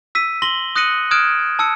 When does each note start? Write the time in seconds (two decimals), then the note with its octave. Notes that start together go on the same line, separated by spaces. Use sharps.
0.15 E6 B6 D#7
0.42 C6 A#6 F#7 G7
0.75 D#6 F#6 A#6 C#7 D#7 F#7
1.11 D#6 F6 F#6 G#6 D7 E7
1.59 A5 E6 C#7